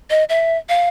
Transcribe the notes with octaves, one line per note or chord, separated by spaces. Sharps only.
D#5
E5
F5